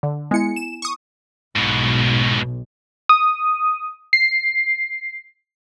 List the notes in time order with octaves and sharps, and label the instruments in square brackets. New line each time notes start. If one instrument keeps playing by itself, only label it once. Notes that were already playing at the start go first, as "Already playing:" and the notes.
[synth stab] D3
[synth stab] G#3 C#7 [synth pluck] B3 E4 G#5
[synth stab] E7
C#6 D#6
[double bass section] B1 [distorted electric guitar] G#2 B2
[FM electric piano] D#6
C7